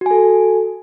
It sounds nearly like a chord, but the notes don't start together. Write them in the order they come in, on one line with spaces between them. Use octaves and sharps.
F#4 G#5 A4